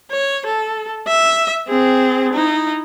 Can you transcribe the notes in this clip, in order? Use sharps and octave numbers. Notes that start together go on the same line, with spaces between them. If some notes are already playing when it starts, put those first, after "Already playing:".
C#5
A4
E5
C4 G#4
D#4 E4